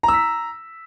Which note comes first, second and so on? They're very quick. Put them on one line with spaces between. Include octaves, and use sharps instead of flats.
A#5 E6 B6